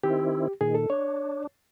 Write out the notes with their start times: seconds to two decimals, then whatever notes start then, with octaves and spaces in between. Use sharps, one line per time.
0.04 D#3 C4 E4 G4
0.61 A#2 D#3 G#4
0.75 A4
0.90 D4 C#5